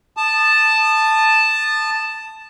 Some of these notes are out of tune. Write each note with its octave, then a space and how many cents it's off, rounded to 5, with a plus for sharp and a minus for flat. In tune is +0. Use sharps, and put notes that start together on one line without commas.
A5 +0 D#6 -30